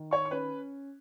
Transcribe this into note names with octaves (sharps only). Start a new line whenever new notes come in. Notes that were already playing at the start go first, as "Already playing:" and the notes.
Already playing: D#3
C#5 C#6
C#6
C#4 B4 B5